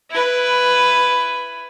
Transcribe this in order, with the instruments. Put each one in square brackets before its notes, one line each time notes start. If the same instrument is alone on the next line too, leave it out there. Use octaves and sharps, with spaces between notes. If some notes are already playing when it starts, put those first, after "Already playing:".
[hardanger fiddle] E4 B4